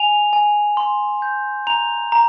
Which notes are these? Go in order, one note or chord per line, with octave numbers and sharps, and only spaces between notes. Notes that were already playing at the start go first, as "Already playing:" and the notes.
Already playing: G#5 F7
G#5
C6
G6
A#5 F7
A#5